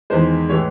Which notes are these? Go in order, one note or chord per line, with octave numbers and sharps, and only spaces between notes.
E2 D#3 G#3 C5
A2 E3 G#3 C#5